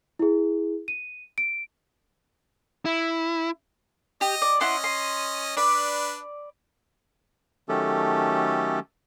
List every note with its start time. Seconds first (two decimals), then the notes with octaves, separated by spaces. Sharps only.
0.19 E4 G#4
0.88 D#7
1.38 D7
2.85 E4
4.21 G4 D#5
4.42 D5
4.61 C#4 E4 D#5 F#5 C6
4.84 C6
5.57 D4 B4 D5 B5
7.69 D#3 F#3 A3 C#4 G4 A4